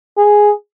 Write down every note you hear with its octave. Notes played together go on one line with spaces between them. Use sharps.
G#4